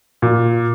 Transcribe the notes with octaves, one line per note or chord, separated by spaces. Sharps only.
A#2